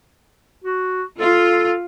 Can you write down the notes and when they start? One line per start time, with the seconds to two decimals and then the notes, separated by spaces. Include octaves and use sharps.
0.64 F#4
1.20 F4 A4